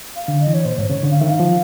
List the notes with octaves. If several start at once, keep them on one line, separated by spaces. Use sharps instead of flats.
F5
D3
D#5
E3
C#5
A#2 C5
G#2 C#5
C#3 C#5
D3
F5
D#3 E5
F5
F3